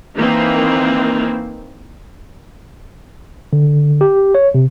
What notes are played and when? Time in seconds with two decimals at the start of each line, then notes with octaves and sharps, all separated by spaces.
0.16 D#3 E3 A#3 C4
3.53 D3
4.01 G4
4.35 C#5
4.55 C3